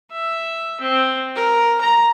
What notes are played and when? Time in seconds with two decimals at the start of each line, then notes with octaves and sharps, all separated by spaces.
0.11 E5
0.81 C4
1.36 A#4
1.81 A#5